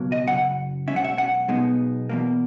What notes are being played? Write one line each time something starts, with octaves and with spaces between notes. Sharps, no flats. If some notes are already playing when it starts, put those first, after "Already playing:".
Already playing: C#2 B2 F#3 A#3
D#5
F#2 C#3 F#5
B1 B2 G#3 C#4 E5
F#5
E5
F#5
B1 B2 G#3 B3 D#4
E2 B2 A#3